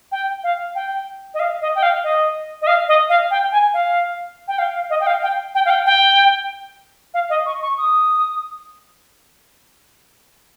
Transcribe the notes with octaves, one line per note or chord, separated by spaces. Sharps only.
G5
F5
G5
D#5
F5
D#5
G5
F5
D#5
D#5
F5
D#5
F5
G5
G#5
F5
G5
F5
F5
D#5
G5
F5
G5
G5
F5
G5
G5
F5
D#5
C#6
C#6
D#6